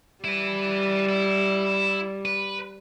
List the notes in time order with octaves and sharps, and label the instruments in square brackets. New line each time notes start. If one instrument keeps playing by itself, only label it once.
[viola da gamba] G3 [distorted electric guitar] E4 B4
[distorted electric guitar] E4
B4